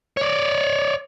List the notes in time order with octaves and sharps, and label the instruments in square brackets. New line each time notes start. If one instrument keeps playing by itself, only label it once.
[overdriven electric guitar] C#5 D5